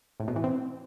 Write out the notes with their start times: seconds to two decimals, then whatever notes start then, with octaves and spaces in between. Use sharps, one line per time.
0.20 A2
0.28 B2
0.36 E3
0.44 C4